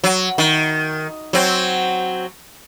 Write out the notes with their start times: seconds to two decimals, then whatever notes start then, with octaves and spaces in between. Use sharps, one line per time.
0.04 F#3
0.38 D#3
1.33 F#3 C4